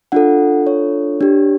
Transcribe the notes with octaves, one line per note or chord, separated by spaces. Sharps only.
D4 F4 A4 F#5
C#5
D4 G4